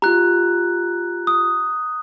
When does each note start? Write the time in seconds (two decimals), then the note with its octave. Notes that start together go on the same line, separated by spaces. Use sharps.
0.02 F4 G4 A#5 F#6
1.27 D#6